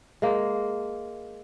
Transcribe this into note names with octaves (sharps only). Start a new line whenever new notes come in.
G#3 A#3